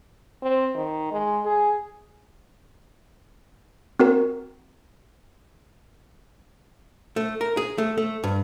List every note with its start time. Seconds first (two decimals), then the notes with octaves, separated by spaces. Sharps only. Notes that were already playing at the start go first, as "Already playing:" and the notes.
0.42 C4
0.75 D#3
1.12 G#3
1.45 G#4
3.99 C4 F#4 A#4
7.16 A3
7.41 A#4
7.57 G#4
7.78 A3
7.98 A3
8.24 G2